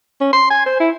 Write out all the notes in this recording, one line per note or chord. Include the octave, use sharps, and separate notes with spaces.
C#4
C6
G#5
C5
E4